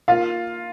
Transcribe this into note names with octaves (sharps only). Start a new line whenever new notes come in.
A#3 F4 F5